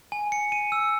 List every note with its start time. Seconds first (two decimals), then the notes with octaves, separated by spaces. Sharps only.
0.12 G#5
0.32 C#7
0.52 D#7
0.72 E6